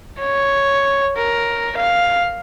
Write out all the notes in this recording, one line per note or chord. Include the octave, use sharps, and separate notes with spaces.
C#5
A#4
F5